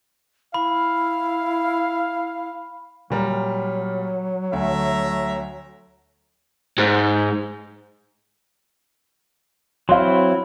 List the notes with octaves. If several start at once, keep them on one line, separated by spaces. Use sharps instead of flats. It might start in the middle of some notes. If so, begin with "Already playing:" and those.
E4 F5 B5
A#2 F#3 G3 A#4
D2 A3 E5 A#5
G#2
F#3 C4 E4 F5 C6